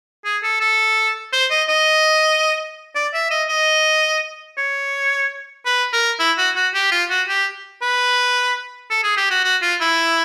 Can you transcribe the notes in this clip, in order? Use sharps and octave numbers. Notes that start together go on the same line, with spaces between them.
G#4
A4
A4
C5
D#5
D#5
D5
E5
D#5
D#5
C#5
B4
A#4
E4
F#4
F#4
G4
F4
F#4
G4
B4
A4
G#4
G4
F#4
F#4
F4
E4